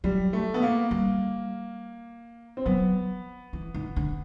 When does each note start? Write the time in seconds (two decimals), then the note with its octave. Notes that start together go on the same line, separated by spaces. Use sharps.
0.04 F#3 G3
0.33 A3
0.54 B3
0.62 A#3
0.91 G3
2.57 C4
2.66 F#3 B3
3.53 E3
3.74 D#3
3.96 D3